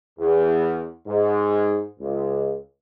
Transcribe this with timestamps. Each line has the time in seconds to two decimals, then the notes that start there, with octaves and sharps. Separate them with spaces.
0.19 E2
1.07 G#2
1.99 C#2